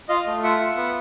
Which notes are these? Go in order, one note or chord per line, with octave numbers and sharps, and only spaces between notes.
F4 D#5 F5
A3
F4 E5 F#5
F4
B3